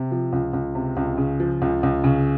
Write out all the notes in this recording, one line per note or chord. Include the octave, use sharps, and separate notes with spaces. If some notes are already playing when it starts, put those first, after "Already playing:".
Already playing: C3
F3
C#2
C#2
C3
C#2
C#3
F3
C#2
C#2
C#3